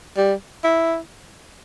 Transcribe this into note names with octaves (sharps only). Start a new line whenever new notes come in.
G3
E4